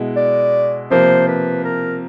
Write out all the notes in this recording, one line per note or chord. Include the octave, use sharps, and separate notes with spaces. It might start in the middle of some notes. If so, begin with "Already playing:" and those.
Already playing: B2 G#3 B3 E4
D5
C3 F3 A#3 C5
B4
A#4